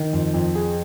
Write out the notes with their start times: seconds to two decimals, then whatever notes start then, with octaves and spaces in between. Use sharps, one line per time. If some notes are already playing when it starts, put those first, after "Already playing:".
Already playing: D#3
0.13 F2
0.34 F2
0.55 G#4